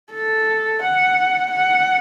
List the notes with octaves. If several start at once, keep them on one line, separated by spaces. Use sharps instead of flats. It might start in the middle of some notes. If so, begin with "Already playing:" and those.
A4
F#5
F#5